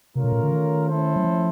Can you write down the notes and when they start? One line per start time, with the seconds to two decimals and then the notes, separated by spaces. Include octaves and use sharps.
0.15 C3 A3 C#4 F4 A#4 C#5
0.24 B2
0.33 A#2
0.43 D3
0.52 D#3
0.88 A3 C#4 E4 A4 C5
1.16 F#3
1.24 F3